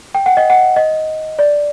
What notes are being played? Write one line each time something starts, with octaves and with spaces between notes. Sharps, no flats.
G5
F#5
D#5
F#5
D#5
D5